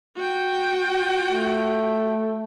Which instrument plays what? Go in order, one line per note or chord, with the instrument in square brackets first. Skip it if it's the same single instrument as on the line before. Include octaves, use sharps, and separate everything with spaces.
[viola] F#4 G5
[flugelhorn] A3